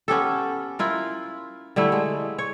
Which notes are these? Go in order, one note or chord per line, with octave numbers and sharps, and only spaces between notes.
B3 C#4 G4 A4
E4 F4 A#4
D3 G3 A3 E4
G#3
C#5